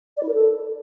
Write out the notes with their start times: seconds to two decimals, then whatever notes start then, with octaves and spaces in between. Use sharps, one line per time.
0.17 D5
0.23 E4
0.28 A#4
0.34 A4